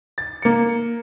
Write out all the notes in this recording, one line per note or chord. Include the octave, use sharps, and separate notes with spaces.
A6
A#3 C#7